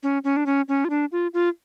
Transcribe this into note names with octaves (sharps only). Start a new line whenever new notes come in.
C#4
C#4
D4
C#4
C#4
F4
D4
F4
F4